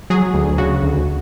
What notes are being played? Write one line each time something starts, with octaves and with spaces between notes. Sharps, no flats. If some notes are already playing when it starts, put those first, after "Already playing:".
F#3 G#4
D2
C#3 F#4
D2